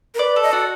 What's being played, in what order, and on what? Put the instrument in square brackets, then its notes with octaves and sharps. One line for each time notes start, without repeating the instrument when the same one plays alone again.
[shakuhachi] A#4
[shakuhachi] B4 [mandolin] D5
[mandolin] A4
[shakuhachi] D#5
[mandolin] F#4 [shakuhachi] D5